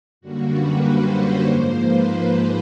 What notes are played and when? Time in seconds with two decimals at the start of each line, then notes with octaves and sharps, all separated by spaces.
0.21 F#2 D3 G3 A#3 F#4
0.52 B4
0.84 C5
1.15 C#5
1.46 G#2 F3 A#3 C5
1.78 B4
2.09 C5